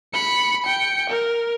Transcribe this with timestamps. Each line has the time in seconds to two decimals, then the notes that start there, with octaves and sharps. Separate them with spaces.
0.13 B5 C#7
0.63 G5 C#7
1.10 A#4